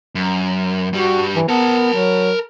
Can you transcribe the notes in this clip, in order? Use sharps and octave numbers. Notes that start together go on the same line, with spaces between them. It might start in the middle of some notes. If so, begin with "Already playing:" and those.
F#2
G2 G3 F#4
E3
B3 A#4 A5
F#3